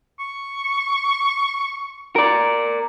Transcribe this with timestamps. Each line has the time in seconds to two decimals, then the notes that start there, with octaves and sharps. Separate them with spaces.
0.19 C#6
2.16 A#4 D5